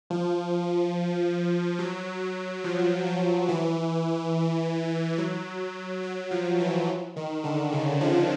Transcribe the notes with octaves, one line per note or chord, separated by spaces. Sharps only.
F3
F#3
F3
F3
E3
F#3
F#3
F3
E3
D#3
D3
C#3
F3